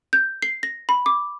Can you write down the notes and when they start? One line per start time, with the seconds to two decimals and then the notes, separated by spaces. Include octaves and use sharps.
0.13 G6
0.42 C7
0.63 A#6
0.89 B5
1.06 D6